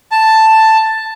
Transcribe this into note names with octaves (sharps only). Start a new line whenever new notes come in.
A5